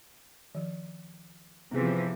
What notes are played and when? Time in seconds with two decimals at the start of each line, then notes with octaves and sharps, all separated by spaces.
0.55 D#3 F3
1.71 C3 E3 F3 B3 G#4